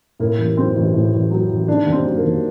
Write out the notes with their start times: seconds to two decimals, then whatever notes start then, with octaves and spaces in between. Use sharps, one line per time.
0.20 A2 A#3
0.38 A1
0.57 F#3 C4
0.76 A1
0.93 A2
1.12 A1
1.31 F#3
1.50 A1
1.67 D#3 D4
1.87 D#2
1.92 C4
2.05 F#3
2.17 A#3
2.24 D#2